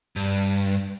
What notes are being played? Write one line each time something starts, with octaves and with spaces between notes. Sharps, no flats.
G2